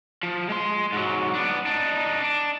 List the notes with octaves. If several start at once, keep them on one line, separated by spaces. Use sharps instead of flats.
F3
G#3 C6
G#2 F#3
B3 D4
D4 D#4
D4